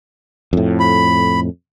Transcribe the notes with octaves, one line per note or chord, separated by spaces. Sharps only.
F2 A2
B5